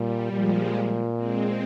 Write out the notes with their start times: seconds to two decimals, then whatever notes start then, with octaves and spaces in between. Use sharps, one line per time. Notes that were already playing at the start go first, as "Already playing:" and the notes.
Already playing: A#2 G3
0.33 A#2 F3 G#3
1.15 G#3 C4